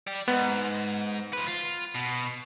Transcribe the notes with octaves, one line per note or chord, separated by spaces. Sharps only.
D5 G5
G#2 B3
F3 B4
F4
B2